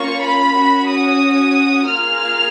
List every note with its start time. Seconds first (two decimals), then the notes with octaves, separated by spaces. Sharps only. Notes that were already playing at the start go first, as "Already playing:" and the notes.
Already playing: A#3 C#4 F4 C#6
0.24 B5
0.57 C#4 F#4
0.89 D#6
1.89 A#3 F4 G#4 F6